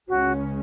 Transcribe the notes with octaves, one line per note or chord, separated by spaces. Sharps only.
C#2 C#3 G#3 C#4 F#4